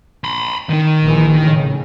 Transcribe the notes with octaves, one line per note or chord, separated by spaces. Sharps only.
B5 C6
D#3 D#4
A#1 E3 F3
A2 C#3